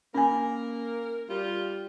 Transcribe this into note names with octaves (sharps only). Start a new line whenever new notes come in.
A#3 C#4 A#4 G#5
G3 F4